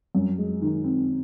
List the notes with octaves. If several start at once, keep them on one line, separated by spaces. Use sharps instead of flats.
F#2
G#3
D#3
C4